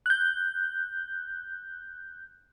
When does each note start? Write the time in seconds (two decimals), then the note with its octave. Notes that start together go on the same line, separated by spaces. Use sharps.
0.06 F#6 G6